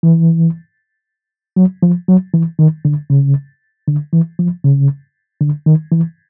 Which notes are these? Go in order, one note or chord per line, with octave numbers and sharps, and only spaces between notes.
E3
F#3
F3
F#3
E3
D#3
D3
C#3
D3
E3
F3
C#3
D3
D#3
E3